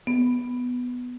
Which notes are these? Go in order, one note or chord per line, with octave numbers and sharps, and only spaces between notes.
B3